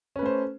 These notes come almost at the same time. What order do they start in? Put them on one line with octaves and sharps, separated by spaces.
C#4 B4 A3 C5